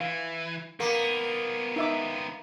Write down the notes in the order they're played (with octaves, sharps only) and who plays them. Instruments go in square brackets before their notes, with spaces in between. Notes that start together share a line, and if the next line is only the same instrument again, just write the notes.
[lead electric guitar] E3 [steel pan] F5
[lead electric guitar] D#3 B3 [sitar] A#3
[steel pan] D#4 E5 D6